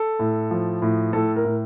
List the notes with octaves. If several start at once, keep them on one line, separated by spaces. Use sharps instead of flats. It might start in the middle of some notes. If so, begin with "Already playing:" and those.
Already playing: A4
A2
F3
A2
A2 A4
A#4
A2